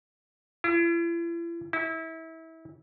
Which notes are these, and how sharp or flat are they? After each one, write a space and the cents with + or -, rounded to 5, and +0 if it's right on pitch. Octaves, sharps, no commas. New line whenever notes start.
E4 +40
E4 -30